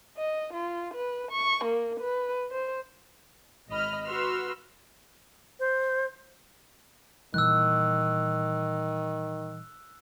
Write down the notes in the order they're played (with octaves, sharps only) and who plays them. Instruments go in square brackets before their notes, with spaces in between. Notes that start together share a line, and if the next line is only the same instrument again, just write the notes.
[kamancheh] D#5
F4
B4
C#6
A#3
B4
C5
[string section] G#1 D#5 B5 F6
F#4 B4 C6 E6 F6
[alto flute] C5
[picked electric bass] A#2 E3 G3 [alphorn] D#3 [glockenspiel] E6 F#6